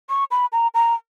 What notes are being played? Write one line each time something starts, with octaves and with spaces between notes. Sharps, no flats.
C#6
B5
A#5
A#5